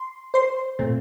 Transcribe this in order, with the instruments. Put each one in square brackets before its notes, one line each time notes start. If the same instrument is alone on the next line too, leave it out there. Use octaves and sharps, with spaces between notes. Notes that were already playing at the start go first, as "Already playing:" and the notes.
Already playing: [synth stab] C6
C5 C6
A#2 A3 C4